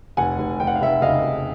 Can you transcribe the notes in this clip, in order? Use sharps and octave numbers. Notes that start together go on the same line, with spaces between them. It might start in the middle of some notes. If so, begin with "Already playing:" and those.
F1 F#5 G#5
F1
F1 G5
F#5
F5
F1 E5 F#5
C#3 D#5 F5
F1